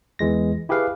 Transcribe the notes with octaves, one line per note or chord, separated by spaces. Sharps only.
E2 E3 G#3 A#6
E4 G4 G#4 B4 F5